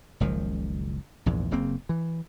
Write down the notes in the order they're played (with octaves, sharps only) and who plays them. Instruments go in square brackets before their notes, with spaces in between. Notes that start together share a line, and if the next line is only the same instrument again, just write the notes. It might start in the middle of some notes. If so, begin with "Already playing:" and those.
[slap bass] F#1 C#2 D#3 F3
A#1 E2 G#2
F#1 C#3 A#3 C4
E3